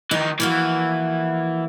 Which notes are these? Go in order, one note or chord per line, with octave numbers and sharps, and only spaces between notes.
D#3 E3 D#4
E3 F3 A#3 F#4